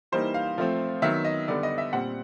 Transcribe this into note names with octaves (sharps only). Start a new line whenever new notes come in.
E3 G3 A#3 D#4 C5
F5
F3 A3 C4
D#3 F#3 B3 E5
D#5
D3 G3 B3 D5
D#5
E5
A#2 G3 C4 F#5